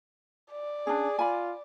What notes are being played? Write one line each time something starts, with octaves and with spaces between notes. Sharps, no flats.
D5
C#4 D4 G#4
F4 G#5 B5